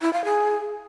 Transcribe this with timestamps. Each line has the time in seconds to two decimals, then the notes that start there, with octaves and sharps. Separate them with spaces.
0.02 E4
0.13 F5
0.25 G#4